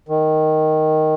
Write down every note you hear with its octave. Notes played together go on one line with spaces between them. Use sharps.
D#3